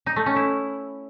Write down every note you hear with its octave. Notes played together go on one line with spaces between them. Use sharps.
D#4
A3
C#4
E4